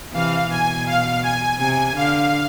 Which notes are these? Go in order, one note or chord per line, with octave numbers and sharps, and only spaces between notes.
C3 E3 F5
B2 G#5
F5
G#5
C3 G#5
D3 F5